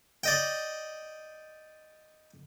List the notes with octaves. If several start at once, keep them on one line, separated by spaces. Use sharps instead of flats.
D5 D#5 G5